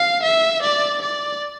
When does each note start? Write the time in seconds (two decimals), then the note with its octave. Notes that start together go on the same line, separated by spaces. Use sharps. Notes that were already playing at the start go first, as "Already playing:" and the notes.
Already playing: F5
0.23 E5
0.62 D5
1.02 D5